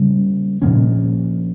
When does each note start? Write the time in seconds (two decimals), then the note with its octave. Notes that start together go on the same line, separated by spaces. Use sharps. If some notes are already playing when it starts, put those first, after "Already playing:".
Already playing: C#3 G3 A#3 C#4
0.62 A#2 F3 A#3 C#4